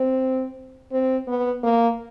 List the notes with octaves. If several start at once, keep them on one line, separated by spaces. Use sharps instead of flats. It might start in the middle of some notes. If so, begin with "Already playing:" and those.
Already playing: C4
C4
B3
A#3